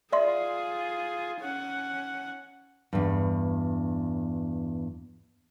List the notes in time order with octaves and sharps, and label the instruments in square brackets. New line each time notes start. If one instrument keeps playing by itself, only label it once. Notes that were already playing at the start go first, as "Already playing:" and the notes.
[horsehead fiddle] F4 G#4 [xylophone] D5 E5 C6
[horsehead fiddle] C#4 F#5
[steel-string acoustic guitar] E2 G2